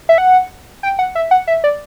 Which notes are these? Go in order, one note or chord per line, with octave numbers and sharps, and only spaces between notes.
E5
F#5
G5
F#5
E5
F#5
E5
D5